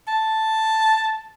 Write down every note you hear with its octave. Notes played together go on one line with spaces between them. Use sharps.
A5